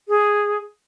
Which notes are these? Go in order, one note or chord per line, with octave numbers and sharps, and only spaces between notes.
G#4